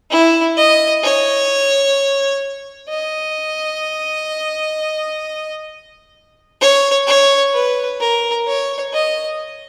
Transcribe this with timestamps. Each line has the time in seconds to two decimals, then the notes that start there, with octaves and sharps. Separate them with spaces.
0.11 E4
0.57 D#5
1.03 C#5
2.89 D#5
6.61 C#5
7.07 C#5
7.53 B4
8.01 A#4
8.47 C#5
8.93 D#5